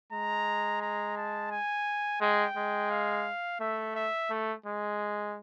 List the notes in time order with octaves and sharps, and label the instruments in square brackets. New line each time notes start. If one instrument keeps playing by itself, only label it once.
[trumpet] G#3 [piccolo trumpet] A#5
[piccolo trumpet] A#5
A5
G#5
[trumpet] G#3 [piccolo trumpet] G5
[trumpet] G#3
[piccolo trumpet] F5
[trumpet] A3 [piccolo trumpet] E5
[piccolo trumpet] E5
[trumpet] A3
G#3